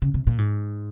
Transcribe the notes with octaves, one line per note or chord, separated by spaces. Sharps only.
C#3
C3
A#2
G#2